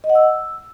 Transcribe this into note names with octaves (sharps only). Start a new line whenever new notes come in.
D#5
F#5
E6